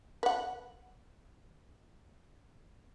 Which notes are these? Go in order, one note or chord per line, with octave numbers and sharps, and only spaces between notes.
B4 F#5